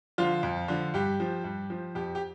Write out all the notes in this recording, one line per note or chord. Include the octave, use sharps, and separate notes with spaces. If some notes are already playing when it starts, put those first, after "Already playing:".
D3 F3 F4
F2
D3 F3
G2 G4
F3
G2
F3
F2 G4
G4